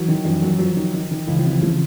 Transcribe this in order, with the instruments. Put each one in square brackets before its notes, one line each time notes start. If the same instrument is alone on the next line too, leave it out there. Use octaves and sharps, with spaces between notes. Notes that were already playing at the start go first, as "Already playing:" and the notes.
Already playing: [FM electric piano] E3 [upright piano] F#3
[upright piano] D#3
[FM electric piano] E3
[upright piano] F#2 [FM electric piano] F3
[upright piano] F#3
[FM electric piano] F3 [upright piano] F#3
[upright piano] D#3
D#3
D#3
[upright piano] C#2 [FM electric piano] E3
[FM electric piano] F3
[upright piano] C3 [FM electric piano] E3
[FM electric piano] C#3 [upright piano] F3